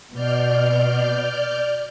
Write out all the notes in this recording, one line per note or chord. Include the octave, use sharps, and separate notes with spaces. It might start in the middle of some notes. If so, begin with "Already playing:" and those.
B2 D5 F6 G6